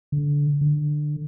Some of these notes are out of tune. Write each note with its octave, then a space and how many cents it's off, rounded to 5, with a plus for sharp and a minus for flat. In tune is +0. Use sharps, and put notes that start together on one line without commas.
D3 -20
D3 +20